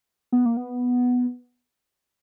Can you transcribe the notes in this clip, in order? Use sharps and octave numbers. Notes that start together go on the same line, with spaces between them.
B3
A#3
B3